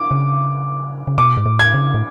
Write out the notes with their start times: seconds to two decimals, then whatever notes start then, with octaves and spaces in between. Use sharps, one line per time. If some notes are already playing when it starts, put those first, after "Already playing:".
Already playing: D6
0.11 C#3
1.07 C#3
1.18 B2 D6
1.37 G#2
1.46 A2
1.59 G#6
1.74 C#3
1.94 A2